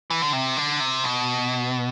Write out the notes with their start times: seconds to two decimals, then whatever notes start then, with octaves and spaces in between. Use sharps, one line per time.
0.10 E3
0.22 D3
0.33 C3
0.57 D3
0.80 C3
1.04 B2